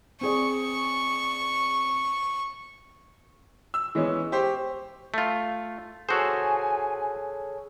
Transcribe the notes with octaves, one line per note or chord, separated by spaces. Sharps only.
C4 G#4 D5 C#6
E6
E3 G#3 B3 C#4
G4 C5 C#6
A3 F4
F#4 G#4 A4 C5 C#5 G#5